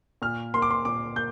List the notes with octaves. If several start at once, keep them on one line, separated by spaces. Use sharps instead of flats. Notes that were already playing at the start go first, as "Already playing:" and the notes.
A#2 F6
A#3 C6
D6
C6
A#2 D6
A#3 G6